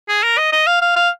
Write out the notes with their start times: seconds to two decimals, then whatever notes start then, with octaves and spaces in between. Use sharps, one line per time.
0.09 G#4
0.23 A#4
0.38 D#5
0.52 D#5
0.67 F5
0.81 F5
0.96 F5